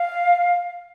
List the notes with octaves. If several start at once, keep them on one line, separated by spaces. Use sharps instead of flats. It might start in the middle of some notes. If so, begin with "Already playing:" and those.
Already playing: F5